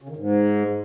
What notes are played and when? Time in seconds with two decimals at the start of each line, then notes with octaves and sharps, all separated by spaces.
0.02 C#3
0.09 D#3
0.16 G#2